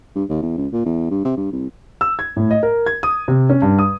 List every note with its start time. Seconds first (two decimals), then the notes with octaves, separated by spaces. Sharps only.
0.15 G2
0.29 D#2
0.42 E2
0.58 C#2
0.73 A#2
0.85 E2
1.11 G2
1.25 C3
1.37 G2
1.52 C2
2.01 E6
2.19 G#6
2.36 A2
2.51 D#5
2.63 A#4
2.86 G#6
3.03 D#6
3.28 C3
3.50 C#4
3.62 G2
3.79 D#6